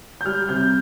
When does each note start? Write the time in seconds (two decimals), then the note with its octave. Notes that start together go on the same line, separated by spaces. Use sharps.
0.21 G6
0.25 G3 F6
0.49 C3 G6